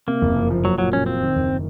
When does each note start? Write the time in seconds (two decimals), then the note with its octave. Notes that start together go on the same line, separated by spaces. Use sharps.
0.07 C3 A#3
0.22 F#1
0.36 F2
0.50 F3
0.64 F#3 A#3
0.78 A#2 F#3
0.92 F#3 C#4
1.06 C4 F4
1.21 D#3
1.35 F#1